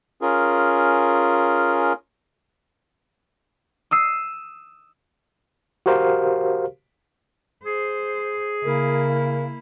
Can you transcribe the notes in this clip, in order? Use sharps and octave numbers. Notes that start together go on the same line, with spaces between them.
C#4 F4 G#4 A#4
D#6 E6 C7
F#4 G4 A#4 C5 F5
G#4 C5
C#3 A#3 E4 A#4